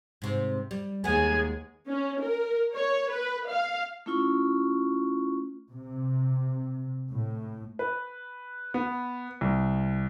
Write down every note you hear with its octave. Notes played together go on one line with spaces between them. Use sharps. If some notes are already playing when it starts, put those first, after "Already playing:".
G#2 C3
G3
D#2 G#3 B3 G#4 G#5
C#4
A#4
C#5
B4
F5
A3 C#4 E4 F4 C#6
C3
A2
B4
B3
C2